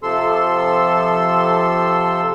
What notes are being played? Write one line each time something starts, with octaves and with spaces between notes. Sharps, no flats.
C3 F3 A4 C6 E6